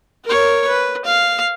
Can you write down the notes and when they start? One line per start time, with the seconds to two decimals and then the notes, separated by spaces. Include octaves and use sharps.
0.25 A#4 C#5
0.68 B4
1.06 F5